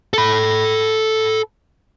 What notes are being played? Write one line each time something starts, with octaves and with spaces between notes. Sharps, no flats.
A4 B5